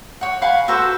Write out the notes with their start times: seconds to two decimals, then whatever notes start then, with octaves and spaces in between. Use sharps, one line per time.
0.21 C#5 F#5
0.42 F5 F#5 G#5 B5
0.68 F#4 A4 B4 C5